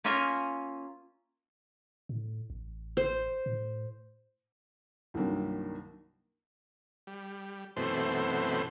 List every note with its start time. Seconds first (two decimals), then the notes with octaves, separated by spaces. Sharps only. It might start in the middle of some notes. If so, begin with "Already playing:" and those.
0.04 A#3 C#4 F4 E5 G#5 A#5
2.09 A2
2.50 A1
2.97 C5
3.46 A2
5.14 C2 G2 D#3 F#3 A#3
7.07 G3
7.76 F#2 B2 E3 A3 C4 C5